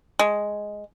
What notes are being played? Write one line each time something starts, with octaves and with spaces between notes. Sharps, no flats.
G#3